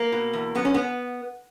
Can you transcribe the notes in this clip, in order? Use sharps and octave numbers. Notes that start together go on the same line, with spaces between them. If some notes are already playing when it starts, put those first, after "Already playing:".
Already playing: A#3
B2
E2
F#2 B3
C#4
B3